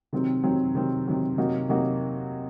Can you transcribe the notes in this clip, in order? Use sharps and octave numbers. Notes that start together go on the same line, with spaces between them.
C3 D#3 F#3 C4
C3 D#3 F#3 C4
C3 D#3 F#3 C4
C3 D#3 F#3 C4
C3 F#3 A#3 D#4 F#4
C3 F#3 A#3 D#4 F#4